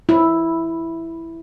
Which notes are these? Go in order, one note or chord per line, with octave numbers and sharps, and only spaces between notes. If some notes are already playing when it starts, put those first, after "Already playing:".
E4